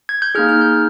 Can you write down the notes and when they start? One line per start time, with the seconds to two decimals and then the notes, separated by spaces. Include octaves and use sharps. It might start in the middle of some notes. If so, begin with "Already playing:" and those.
0.09 G#6
0.22 G6
0.35 A#3 D#4 G#4 F6
0.49 F6
0.61 G6